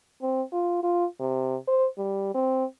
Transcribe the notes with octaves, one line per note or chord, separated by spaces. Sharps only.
C4
F4
F4
C3
C5
G3
C4